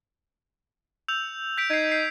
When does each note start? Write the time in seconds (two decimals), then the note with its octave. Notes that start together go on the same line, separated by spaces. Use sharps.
1.08 E6 G6 F7
1.58 G6 B6 D7
1.70 D#4 G#6 C7
1.92 C7